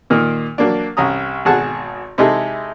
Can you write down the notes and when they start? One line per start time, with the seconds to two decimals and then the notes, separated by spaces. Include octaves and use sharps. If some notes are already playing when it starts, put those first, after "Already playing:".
0.10 A#2 D#3 A#3
0.58 F#3 A#3 D4
0.97 C2 C#4 A#5 D#6
1.45 G#1 B2 G#4 F#5 A5
2.18 C3 G#3 D#4 E4 G#4 A4